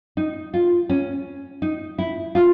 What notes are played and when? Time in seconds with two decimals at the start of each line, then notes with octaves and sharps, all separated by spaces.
0.17 D#4
0.54 F4
0.89 C#4
1.62 D#4
1.98 E4
2.35 F4